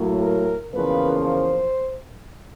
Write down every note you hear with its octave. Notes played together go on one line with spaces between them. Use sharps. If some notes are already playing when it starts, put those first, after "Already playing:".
Already playing: A2 F#3 A#3
A#4
E2 C#3 F3 A#3 B4
C5